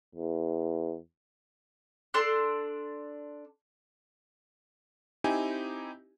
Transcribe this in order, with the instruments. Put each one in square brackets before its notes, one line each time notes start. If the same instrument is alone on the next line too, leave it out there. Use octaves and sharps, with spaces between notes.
[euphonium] E2
[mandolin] D4 A4 C6 F#6
[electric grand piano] C4 D#4 E4 G4 G#5